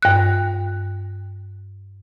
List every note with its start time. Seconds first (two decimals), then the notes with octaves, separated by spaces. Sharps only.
0.02 G2 F#6